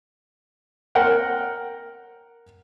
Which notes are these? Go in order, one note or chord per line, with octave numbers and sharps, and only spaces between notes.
A#4 F#5 G5